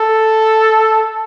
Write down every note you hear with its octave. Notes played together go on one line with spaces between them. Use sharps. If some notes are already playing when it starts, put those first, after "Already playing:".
Already playing: A4